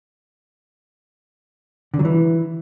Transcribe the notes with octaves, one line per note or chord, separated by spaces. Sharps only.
D3
F#3
E3